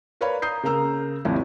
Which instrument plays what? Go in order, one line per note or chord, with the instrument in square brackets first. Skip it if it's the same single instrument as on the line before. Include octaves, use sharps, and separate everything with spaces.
[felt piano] A#4 B4 C#5 D5 F5 B5
A#5 D#6 G6 C7
C#3 A#3 A#4 A#5 E6
G#1 D#2 C3 F3 E4